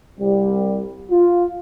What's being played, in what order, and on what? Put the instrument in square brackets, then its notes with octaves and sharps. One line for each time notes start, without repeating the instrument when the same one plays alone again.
[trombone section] C2 G3
F4